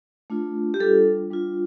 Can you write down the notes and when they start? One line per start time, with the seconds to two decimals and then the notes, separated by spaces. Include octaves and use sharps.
0.30 A3 D4 F4
0.74 G4
0.80 G3 D4 F4 A4
1.31 G3 D4 F4